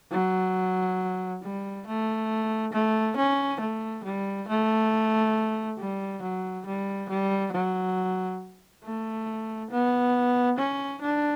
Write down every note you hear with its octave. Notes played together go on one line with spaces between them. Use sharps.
F#3
G3
A3
A3
C#4
A3
G3
A3
G3
F#3
G3
G3
F#3
A3
B3
C#4
D4